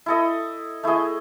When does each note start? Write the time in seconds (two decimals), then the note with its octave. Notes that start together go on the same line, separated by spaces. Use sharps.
0.06 E4 A4 D#5
0.83 A3 E4 G#4 D#5